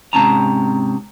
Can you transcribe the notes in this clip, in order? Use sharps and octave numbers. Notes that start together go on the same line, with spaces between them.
G#2 C3 C4 C#4 A5 A#5